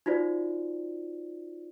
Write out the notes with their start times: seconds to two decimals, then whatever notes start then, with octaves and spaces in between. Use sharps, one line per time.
0.06 D#4 F4 F#4 C5 D5